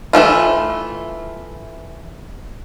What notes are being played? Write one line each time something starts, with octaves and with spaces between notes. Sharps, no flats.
E3 F3 A3 F4